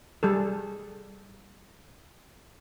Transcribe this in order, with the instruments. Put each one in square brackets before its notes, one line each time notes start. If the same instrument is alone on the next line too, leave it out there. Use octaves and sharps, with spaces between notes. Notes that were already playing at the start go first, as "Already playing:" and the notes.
[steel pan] G3 G#4 A4